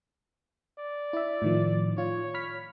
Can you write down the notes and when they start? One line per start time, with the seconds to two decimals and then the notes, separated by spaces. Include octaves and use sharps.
0.79 D5
1.13 E4 E5
1.42 A2 D#3 F3
1.98 F4 C#5
2.34 B5 F6 B6